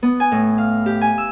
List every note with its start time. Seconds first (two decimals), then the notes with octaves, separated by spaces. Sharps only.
0.03 B3
0.20 G#5
0.32 A2
0.58 F5
0.86 G4
1.01 G#5
1.18 E6